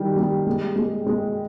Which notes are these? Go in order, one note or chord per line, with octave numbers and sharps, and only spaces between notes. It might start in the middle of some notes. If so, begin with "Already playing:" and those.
Already playing: D#3 G3
G3
G#3
G#3
G#3